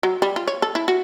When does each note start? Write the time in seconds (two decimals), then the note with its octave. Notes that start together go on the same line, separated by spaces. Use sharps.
0.03 F#3
0.22 G3
0.36 F4
0.47 C#5
0.62 A4
0.75 E4
0.88 F#4